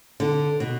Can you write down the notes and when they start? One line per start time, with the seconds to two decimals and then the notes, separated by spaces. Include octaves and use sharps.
0.20 D3
0.60 B2